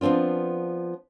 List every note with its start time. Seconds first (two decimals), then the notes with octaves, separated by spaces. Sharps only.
0.01 F3 B3 C4 D4 F4